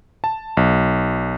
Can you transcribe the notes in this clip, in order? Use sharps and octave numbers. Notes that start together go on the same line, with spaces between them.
A5
B1